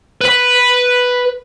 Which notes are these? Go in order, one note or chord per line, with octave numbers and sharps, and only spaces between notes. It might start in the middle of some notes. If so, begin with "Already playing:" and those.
B4 B5